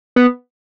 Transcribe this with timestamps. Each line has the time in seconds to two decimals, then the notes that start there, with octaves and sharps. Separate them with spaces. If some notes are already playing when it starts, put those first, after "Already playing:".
0.16 B3